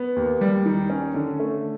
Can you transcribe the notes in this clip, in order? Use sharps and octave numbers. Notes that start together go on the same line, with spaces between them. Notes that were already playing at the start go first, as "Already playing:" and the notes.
Already playing: B3
D#2
G3
D#3
C#4
D3
A3